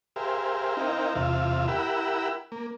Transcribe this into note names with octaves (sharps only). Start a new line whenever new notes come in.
G4 G#4 A#4 C5 E5 F5
C4 D#4 E4 A#4 F5 G5
E2 C3 F4 E5 F5
E4 G4 A#4 F#5 B5 E6
A#3